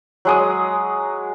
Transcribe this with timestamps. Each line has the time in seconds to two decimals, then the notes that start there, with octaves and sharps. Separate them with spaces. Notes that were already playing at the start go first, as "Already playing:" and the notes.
0.25 F#3 G#3 D#6